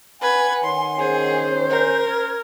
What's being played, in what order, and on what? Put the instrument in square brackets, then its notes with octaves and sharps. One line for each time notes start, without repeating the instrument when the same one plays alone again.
[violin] B4 G#6 [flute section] F#5 G#5
[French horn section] D#3 C#5 [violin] C6
[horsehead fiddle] C#4 C5 [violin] G#4
[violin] A#4 [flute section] G#5 G6
[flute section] F6 G#6